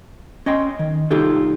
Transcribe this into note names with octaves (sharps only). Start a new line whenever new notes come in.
C#4 D#5 G5 C6
D#3
C2 D#4 F4 G4 A4